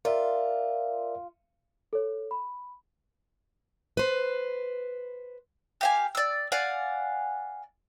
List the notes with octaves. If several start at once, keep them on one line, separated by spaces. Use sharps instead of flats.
F4 A#4 D5 E5
A4 C#5
B5
B4 C5
G4 F5 G#5
D5 E6
D5 F5 F#5 G#5